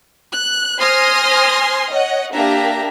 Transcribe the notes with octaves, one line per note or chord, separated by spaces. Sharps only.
F#6
C5 G#5 C6 D#6 F6 A#6
C#5 D#5 F#5
A#3 D4 G4 E5 A#5